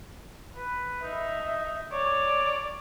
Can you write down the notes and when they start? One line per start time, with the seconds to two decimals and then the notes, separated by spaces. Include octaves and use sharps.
0.56 B4
1.03 D#4 E5
1.92 C#5 D5